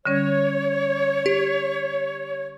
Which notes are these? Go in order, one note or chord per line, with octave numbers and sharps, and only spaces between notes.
D3 G3 C#4 C#5
G4